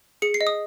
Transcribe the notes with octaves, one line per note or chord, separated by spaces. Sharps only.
G#4 C#7
C7
D#5
D#6